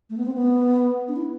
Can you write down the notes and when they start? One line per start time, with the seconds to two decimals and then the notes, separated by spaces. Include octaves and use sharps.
0.10 A3
0.17 B3
0.26 C4
0.34 B3
1.08 D4
1.16 E4